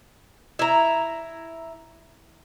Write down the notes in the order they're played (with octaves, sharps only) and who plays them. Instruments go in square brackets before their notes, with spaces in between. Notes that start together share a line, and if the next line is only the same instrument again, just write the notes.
[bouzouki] E4 A#5